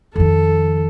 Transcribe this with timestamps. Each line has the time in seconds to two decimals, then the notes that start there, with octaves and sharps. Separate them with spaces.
0.16 F2 D#3 A4